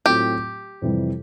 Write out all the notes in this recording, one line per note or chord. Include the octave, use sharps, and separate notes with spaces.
A2 F#3 A3 C4 F4 G4
F2 C3 E3 G3